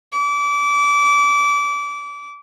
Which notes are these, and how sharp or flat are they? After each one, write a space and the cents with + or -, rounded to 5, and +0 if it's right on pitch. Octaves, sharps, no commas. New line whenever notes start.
D6 -25